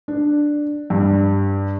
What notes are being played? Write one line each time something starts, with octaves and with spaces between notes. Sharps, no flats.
D4
G2